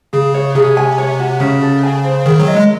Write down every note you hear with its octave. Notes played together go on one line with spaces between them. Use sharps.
C#3 G#4
C#5
C3 G#4
G#5
C#5
F#4
C#3 C#4
A4
G#5
C5
D#3 G#4
F#3
D#5
G#3